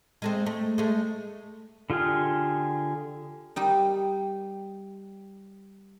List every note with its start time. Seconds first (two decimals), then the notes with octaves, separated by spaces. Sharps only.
0.22 G#3 A3 C4
0.46 A3
0.78 G#3 A3
1.90 D3 F4 G4 G#4 F6
3.56 G3 D#4